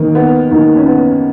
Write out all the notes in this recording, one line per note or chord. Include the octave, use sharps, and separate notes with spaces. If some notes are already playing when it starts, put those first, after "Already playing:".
Already playing: D#2 D#3 A#3
B3
D#2 D#3 A#3
C#4
B3